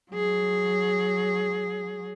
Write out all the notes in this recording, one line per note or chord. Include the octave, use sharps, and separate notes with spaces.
F#3 G#4